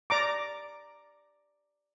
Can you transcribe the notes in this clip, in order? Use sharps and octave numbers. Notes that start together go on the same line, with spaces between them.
D5 A#5 D6